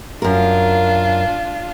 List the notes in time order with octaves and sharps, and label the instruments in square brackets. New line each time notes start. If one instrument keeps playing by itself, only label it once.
[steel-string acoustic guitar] F#2 A#4 [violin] D4 F4